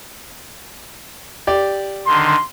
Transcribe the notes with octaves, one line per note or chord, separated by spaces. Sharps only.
G4 D5
D3 D#3 C6